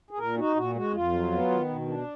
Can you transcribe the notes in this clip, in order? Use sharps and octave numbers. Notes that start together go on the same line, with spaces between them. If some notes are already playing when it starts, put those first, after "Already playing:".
G#4
A#2 A#4
D#4 F#4
A#2 F#4
G#3 F#4
F2 F4
F#3
B3
D#3
B2
D4